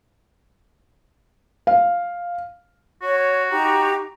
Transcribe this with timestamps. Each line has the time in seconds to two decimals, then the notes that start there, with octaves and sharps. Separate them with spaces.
1.67 F5
3.02 F#4 C#5
3.51 D#4 G4 A#5